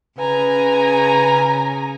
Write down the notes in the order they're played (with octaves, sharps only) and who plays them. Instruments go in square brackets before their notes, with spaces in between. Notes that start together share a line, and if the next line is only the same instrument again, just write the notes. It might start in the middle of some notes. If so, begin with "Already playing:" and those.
[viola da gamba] C#3 [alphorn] B4 [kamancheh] G#5 A#5